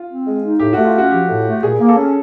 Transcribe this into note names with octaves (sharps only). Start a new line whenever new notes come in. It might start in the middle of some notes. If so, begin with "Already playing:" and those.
Already playing: F4
C4
G#3
D#4
A2 G4
A3 F#4
F4
C#4 F#4
F3 G4
A2
A3
A#2 G#4
A#3
A4
C#4